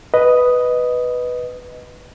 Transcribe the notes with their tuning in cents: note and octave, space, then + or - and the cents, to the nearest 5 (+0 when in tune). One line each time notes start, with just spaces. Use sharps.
B4 +0 D#5 +0